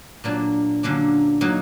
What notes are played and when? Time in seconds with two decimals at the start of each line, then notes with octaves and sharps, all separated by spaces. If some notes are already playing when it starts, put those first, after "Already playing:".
0.24 A#2 F#3 A#3 D4
0.83 F#2 D3 F#3 A#3 D4
1.41 F#3 A#3 D#4